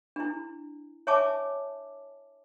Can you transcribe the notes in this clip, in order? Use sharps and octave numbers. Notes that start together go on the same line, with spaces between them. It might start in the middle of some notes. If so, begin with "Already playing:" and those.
D4 E4
C#5 E5 G#5 A5 D6